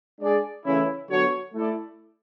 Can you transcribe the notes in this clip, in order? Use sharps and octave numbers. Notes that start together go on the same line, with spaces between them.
G#3 D4 G#4 D5
C#3 E3 A3 C#4 E4
D3 F#3 B3 F#4 C#5
A3 E4 A4 D5